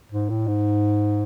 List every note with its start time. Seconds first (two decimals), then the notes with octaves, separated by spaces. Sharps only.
0.12 G#2
0.30 A2
0.47 G#2